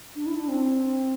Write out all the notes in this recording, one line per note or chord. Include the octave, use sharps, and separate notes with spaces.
D4
E4
D4
C4